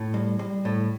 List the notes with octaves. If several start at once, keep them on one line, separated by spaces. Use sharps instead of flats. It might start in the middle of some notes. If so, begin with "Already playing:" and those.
Already playing: A2
G3
G3
A2